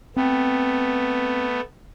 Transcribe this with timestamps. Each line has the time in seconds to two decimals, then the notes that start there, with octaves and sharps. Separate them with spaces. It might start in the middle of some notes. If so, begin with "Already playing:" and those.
0.16 A3 B3 C4